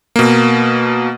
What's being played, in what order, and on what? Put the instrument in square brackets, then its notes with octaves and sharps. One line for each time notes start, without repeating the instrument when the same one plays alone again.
[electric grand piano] B2 A#3